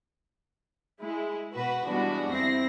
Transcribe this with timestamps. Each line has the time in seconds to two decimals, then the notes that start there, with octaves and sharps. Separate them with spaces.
1.02 G#3 E4
1.55 B2 F#4 B4
1.86 E3 G3 G#3 B3 D4 F#4
2.31 F2 C4 E4 A#6 C7